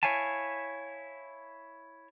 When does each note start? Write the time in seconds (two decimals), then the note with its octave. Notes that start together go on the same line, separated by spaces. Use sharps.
0.03 E4 C#5 F5 G#5 A5